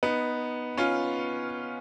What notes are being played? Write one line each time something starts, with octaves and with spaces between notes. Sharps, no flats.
B3 D#4
C#4 F4